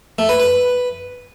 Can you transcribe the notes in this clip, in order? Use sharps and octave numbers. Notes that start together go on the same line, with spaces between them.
A3
B4
B4